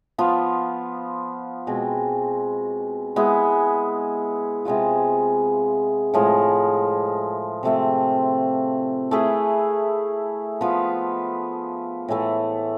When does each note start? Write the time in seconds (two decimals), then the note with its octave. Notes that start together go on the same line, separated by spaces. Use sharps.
0.18 F3 B3 F4
1.67 B2 G#3 C4
3.16 G#3 B3 E4 G#4
4.65 C3 G#3 B3 F4
6.14 A2 F3 G#3
7.63 C3 F3 A3 C4
9.11 A3 E4 G#4 B4
10.61 F3 B3 F4 B4
12.08 A2 E3 A3